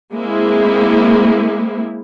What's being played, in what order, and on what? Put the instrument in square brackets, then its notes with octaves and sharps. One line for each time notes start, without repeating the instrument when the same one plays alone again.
[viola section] G#3 A#3 C4 E4